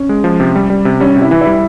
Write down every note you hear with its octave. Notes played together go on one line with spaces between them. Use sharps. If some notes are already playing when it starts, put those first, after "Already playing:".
Already playing: C#4
G#3
F3
C3
G3
G3
C3
G3 C#4
C3
E4
E3
E4
G3